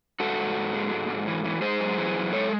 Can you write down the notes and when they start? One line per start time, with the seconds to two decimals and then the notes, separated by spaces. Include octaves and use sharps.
0.20 G#2 F#4 A4
0.39 G#2
0.56 G#2
0.74 G#3
0.92 G#2
1.08 G#2
1.27 E3
1.44 E3
1.62 G#3 G#4 C5
1.80 F#2
1.98 E3
2.16 F#2
2.33 G#3 A4 C#5